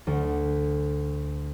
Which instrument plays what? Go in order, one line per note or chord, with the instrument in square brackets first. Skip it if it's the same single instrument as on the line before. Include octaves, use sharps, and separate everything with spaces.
[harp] D2